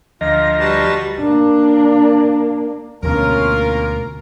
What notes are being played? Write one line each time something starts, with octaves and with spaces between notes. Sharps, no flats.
D2 F3 F4 D#5 A#5
G3 F#4 B4 A5
A#3 D4
D2 B2 A#3 C#4 F4 A#4